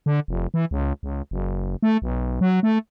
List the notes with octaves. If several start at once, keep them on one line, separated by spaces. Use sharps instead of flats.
D3
F1
E3
C#2
C#2
F#1
A3
B1
F#3
A3